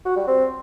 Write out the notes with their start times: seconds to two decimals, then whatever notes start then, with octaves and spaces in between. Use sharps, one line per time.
0.05 F#4
0.16 G3
0.27 C4